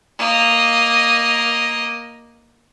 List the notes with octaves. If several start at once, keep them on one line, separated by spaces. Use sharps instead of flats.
A#3 D#5